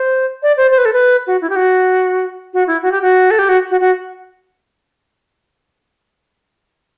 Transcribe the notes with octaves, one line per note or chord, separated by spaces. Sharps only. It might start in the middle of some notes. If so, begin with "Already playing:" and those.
Already playing: C5
D5
C5
C5
B4
A4
B4
F#4
E4
G4
F#4
F#4
E4
F#4
G4
F#4
A4
G4
F#4
F#4
F#4